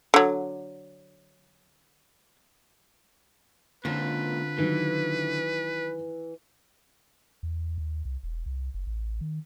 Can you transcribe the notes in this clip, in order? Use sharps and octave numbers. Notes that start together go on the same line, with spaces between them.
D3 F#3
C#2 A#2 D3 C4 F4 B4
D#3 E3 F#3
E2
D#2
C2
E1
C2
F#1
A1
D#3